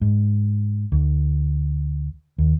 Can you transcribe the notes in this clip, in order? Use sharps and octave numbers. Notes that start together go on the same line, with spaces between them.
G#2
D2
D#2